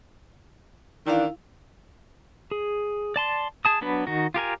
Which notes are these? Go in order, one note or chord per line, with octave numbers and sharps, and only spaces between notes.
D#3 E3 D4 E4 F5
G#4
D5 A5 C6
G#4 A5 D#6
F#3 B3 D4 B4
D#3 D#4 F#4
F4 G4 A#4 G#5